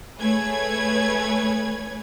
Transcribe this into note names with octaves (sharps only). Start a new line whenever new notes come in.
A3 G#4 B4 C#5 G#6